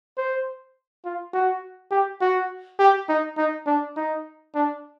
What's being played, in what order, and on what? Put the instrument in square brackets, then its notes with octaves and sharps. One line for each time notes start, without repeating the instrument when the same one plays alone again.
[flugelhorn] C5
F4
F#4
G4
F#4
G4
D#4
D#4
D4
D#4
D4